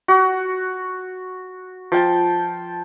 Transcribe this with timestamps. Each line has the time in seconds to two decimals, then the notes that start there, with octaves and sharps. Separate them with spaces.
0.08 F#4
1.92 F3 G5 A5